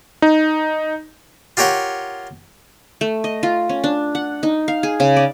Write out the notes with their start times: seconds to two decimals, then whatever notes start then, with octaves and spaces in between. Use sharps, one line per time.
0.22 D#4
1.57 F4 G4 A#4 C#5 F#5
3.01 A3
3.24 D#5
3.43 F4
3.69 C#4
3.84 D4
4.15 F#5
4.43 D#4
4.68 F5
4.83 G#4
5.00 C#3
5.16 D5